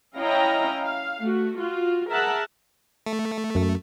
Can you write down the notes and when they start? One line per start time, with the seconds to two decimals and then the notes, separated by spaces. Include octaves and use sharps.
0.17 C#4 E4 D#5 F5 G5 A#5
0.84 F5
1.21 A3 F#4
1.57 F4 F#4
2.10 G#4 A#4 E5 F#5 A5
3.06 A3
3.55 F#2